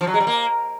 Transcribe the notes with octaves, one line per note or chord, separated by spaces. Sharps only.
F3
F#3
G#3
G3
A#3